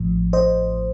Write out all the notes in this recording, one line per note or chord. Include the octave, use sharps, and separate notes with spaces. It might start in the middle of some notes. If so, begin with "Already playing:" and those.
Already playing: A1 A2 F3
C5 D#5